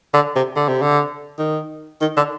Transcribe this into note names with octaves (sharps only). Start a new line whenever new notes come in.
D3
C3
D3
C3
D3
D#3
D#3
D3